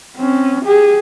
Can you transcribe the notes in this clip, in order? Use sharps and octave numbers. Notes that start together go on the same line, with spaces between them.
C4 C#4
G4 G#4